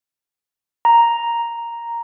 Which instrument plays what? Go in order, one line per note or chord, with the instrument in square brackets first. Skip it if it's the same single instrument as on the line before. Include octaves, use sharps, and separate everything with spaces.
[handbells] A#5